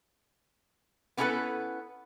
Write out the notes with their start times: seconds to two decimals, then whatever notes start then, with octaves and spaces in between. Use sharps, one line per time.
1.17 B3 C#4 E4 F4 A4 B4